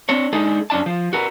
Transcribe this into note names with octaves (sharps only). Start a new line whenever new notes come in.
C4 D4 C#5
G#3 D4 D#4 G#4 A4
F#2 C#4 D4 D#5 A5
F3
F#4 A#4 B4